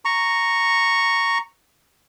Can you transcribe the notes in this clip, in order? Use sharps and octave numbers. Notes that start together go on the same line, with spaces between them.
A#5 C#6